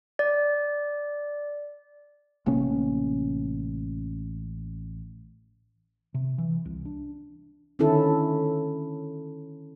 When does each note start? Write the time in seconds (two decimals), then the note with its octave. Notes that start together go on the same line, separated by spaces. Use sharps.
0.19 D5
2.46 A1 C3 A#3 C#4
6.14 C3
6.38 E3
6.65 C2
6.85 D4
7.79 D3 D#3 C#4 E4 A4